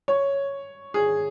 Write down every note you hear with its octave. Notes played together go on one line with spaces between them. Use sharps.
C#5
G#4